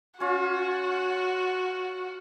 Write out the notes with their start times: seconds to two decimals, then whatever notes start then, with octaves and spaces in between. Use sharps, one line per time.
0.20 C#4 F4 F#4